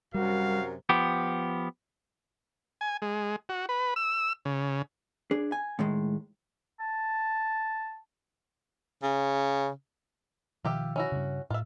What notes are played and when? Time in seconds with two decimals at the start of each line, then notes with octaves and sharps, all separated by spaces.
0.14 F#2 C3 G3 F#4 A#4 F5
0.89 F3 B3 G4
2.81 G#5
3.02 G#3
3.49 F#4
3.69 B4
3.96 E6
4.45 C#3
5.31 D4 G#4
5.52 G#5
5.79 A2 D#3 G#3
6.80 A5
9.03 C#3
10.65 B2 D#3 F3 F4 G4 E5
10.96 C#4 E4 F#4
11.12 G2 C#3
11.50 A2 F4 E5